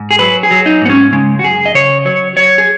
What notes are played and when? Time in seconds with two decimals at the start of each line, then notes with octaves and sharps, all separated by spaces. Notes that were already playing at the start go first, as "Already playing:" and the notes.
Already playing: G#2
0.11 G#4
0.19 F#3 B4
0.43 G#4
0.51 F#3
0.66 D#4
0.82 G#2 B3
0.90 C#4
1.12 C#3 G#3
1.39 F#4
1.44 F#2 G#4
1.66 D#5
1.74 C#3 C#5
2.05 F#3 C#5
2.36 F#3 C#5
2.58 G#4